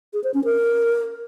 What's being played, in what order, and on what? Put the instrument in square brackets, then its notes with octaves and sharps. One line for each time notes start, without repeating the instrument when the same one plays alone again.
[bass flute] G#4
C5
C#4
A#4